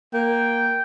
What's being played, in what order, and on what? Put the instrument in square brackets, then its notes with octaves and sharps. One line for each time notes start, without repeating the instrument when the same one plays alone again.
[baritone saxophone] A#3 [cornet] G5